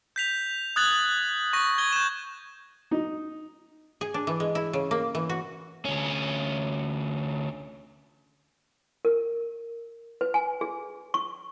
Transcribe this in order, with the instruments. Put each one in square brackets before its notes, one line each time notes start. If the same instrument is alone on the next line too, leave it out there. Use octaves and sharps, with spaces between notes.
[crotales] G6 B6 F7
D#6 F#6 G#6 A6 F#7
C#6 A#6
G#6 G7
G6 E7
[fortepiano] D#4
[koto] G#4
D4
E3
G#3
E4
C#3
A#3
E3
F#4
[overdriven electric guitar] D2 C#4
[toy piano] A#4
B4
G#5
G#4
C#6